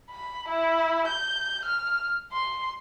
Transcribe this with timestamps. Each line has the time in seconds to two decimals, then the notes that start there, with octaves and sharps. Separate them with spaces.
0.11 B5
0.49 E4
1.08 G6
1.66 F6
2.33 C6